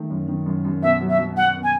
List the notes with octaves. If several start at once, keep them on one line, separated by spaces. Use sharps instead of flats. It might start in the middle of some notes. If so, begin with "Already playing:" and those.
Already playing: D#3 A3
F#2
D#3
F#2
F#2
B2 E5
F#3
E5
F#3
F#3 F#5
B2
G#5